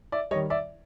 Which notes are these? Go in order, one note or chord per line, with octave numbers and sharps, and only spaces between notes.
D5 E5
D#3 G3 C#5 D#5
D5 E5